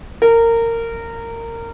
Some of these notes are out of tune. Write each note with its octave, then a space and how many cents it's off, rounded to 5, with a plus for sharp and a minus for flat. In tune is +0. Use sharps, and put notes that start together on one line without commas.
A#4 -20